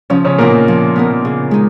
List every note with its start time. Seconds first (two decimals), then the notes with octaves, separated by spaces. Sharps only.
0.10 C#3 F3 C#4
0.25 C#3 C#4
0.38 A#2 A#3 B3 D#4 A#4
0.68 F3
0.96 B3 D#4 A#4
1.25 C#3
1.51 G#3 D#4